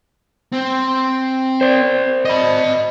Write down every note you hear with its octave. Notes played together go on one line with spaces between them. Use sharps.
C4
C5 D5
D#5 B5